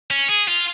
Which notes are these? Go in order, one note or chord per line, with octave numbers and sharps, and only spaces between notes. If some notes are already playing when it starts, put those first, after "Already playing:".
C#4
G#4
F4